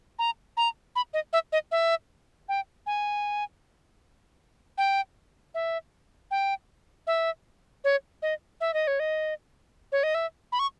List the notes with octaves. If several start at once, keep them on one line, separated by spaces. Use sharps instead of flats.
A#5
A#5
B5
D#5
E5
D#5
E5
G5
G#5
G5
E5
G5
E5
C#5
D#5
E5
D#5
C#5
D#5
C#5
D#5
E5
B5
C#6